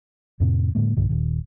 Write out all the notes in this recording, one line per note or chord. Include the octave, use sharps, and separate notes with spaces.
F2 A2 C3 C4
A2 D3 G#3 A#3
B1 G2 D3
D#1 A#2 D#3